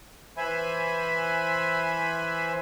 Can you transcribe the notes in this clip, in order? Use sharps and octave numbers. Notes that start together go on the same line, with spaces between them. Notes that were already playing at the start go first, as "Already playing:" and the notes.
E3 C5 E5 G#5 B5